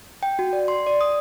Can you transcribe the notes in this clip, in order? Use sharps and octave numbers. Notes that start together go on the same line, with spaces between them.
G5
F#4
D5
C6
D5
D#6